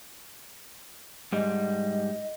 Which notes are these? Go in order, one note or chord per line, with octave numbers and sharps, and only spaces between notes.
G#2 G3 D#5